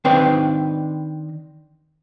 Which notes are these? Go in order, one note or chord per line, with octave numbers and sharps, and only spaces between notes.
D#3 C4 D4 B4 F5